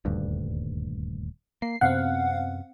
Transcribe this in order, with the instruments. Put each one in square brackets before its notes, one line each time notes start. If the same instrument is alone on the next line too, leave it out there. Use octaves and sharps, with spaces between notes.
[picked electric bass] D#1 D2 G2
[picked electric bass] A#3 [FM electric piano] C7
[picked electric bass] F#2 C3 B3 [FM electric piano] C4 F5 F#5